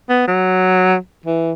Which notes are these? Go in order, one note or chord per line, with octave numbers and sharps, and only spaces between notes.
B3
F#3
E3